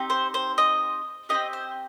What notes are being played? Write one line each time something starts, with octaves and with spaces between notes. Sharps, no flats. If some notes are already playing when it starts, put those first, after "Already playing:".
Already playing: C4 D#4 G4
C5
C5
D#5
D#4 G4 D#5
C4
C5